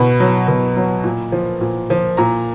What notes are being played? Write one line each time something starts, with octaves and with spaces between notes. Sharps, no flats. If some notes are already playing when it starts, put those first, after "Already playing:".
Already playing: B2 B5
F#3
B2
F#3
A#2
F3
A#2
F3
A#2 A#5